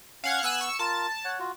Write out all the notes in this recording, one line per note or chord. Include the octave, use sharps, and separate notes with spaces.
C#4 F5 F#5 G#6
B3 G#5 E6 F#6
C#6 E6
F4 A#4 A5
C#5 F#5
F4 F#4